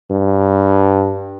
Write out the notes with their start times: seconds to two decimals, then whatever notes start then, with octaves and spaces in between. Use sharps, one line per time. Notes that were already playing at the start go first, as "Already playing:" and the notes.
0.11 G2